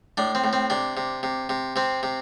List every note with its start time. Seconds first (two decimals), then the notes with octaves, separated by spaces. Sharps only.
0.17 A2 D4
0.35 C4
0.44 A2
0.53 C4
0.70 C3 D4
0.97 C3
1.23 C3
1.49 C3
1.76 C3 C4
2.03 C3